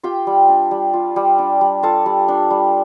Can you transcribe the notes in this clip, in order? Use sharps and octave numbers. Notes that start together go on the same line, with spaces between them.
F4 G4 G5
G3
D4
G3
F4
G3
D4
G3
F4 A4 A5
G3
D4
G3